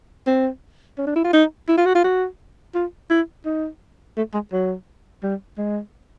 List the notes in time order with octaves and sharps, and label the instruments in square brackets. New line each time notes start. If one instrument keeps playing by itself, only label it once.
[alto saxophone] C4
C#4
D4
E4
F4
D#4
E4
F4
F#4
F4
F#4
F4
E4
D#4
A3
G#3
F#3
G3
G#3